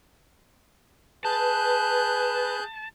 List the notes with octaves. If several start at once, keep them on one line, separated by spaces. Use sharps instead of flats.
G#4 B4 A5 F#6 G6